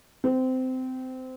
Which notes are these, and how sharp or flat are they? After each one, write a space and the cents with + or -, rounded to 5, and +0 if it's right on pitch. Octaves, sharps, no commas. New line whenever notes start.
C4 -20